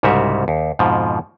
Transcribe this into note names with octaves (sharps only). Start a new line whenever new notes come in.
C2 G#2 C#3 G3 F#4 E5
D#2
F2 G#2 B2 F3